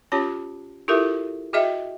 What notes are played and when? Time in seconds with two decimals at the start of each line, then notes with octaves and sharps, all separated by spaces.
0.12 C#4 F4 G4 C#5 A5
0.88 E4 F4 G4 A4 A#4 E5
1.53 F#4 G#4 D#5 E5 G5